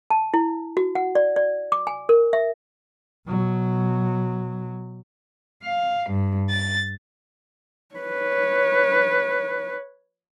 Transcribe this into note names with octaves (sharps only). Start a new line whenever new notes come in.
A5
E4
F#4
F#5
D5
D5
D6
G#5
A#4
E5
B2 F#3
F5
G2
A6
B4 C#5